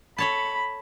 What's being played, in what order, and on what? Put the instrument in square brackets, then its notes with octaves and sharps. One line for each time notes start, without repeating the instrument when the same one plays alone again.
[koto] A4 C#5 A5 [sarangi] B5